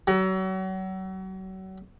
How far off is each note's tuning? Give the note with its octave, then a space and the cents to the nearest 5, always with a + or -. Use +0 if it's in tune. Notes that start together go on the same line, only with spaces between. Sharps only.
F#3 +35